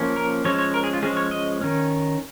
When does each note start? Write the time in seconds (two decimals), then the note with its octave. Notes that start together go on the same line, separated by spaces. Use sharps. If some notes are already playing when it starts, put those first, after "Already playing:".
Already playing: F3 A#3 C#4
0.16 A#4
0.44 F3 G#3 C#4 C#5
0.59 C#5
0.74 A#4
0.84 G#4
0.94 F4
1.02 F3 G#3 C#4 G#4
1.17 C#5
1.31 D#5
1.61 D#3 C#4